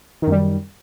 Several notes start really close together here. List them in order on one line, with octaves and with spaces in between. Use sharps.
D#3 F#2 G3